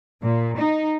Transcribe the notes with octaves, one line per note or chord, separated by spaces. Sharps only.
A#2
D#4